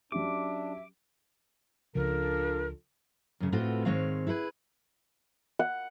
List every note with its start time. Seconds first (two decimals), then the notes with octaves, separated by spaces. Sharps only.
0.12 F#3 C#4 D4 G4 E5 D6
1.95 C#2 C#3 F3 D4 F4 A4 A#4
3.40 F#2 C#3
3.52 A2 C4 F4 F#4 A4 B4
3.85 G#2 D#3 G#3 C4 C#5 F5
4.27 E4 G#4 A4 B4
5.59 F#5